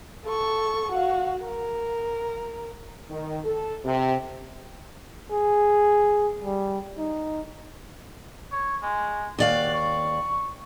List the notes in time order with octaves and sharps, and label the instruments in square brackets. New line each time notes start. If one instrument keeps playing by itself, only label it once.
[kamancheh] A4 C#6
F#4 F5
A#4
[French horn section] D#3
A4
C3
[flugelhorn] G#4
G3
D#4
[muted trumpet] C#5
G#3
[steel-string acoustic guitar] D#2 D5 F5 [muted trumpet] F#4
[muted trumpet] C#6